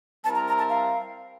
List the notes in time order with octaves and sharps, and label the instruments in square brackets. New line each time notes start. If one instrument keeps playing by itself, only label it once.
[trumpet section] G3 C4 E4 A#4 [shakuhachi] A5
[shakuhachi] A#5
A#5
A5
F5